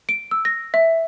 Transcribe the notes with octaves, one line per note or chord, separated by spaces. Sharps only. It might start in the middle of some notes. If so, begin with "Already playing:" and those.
D7
E6
A#6
E5